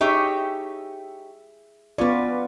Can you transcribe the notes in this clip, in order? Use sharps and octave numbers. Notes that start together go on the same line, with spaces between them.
D#4 G4 G#4 C#5 E5
B3 C#4 F4 B4 D5